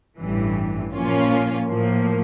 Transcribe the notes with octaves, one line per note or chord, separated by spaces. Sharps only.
A1 G2 E3
A#2 F3 A#3 C#4 F4
A2 F3 A#3